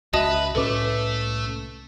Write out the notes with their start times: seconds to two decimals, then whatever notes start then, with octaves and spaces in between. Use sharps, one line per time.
0.13 C#2 F#4 B4 D#5 E5 A5 D#6
0.55 C2 A2 A3 C#4 A4 B4 D6